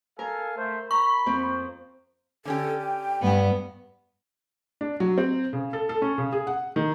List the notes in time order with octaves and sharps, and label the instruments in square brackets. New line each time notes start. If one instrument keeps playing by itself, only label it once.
[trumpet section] A4 F5 G#5 [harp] A#4
[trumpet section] A3 C5 E5
[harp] A#5 [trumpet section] B5 [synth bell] C#6
[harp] F2 C4
[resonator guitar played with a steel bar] D3 C#4 G4 [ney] A4
[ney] G5
[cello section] G2 [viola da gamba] B3
[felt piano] D4
F#3
C4
C#3
A4
A4
C#4
C#3
G#4
F#5
D#3